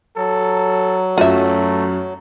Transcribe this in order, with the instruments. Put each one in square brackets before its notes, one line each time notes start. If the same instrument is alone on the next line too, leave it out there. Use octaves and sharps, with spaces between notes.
[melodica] F#3 [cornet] A4
[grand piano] F#2 [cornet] A3 [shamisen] F4 E5